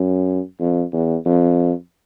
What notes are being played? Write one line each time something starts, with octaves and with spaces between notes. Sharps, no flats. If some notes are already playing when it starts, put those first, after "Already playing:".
Already playing: F#2
F2
E2
F2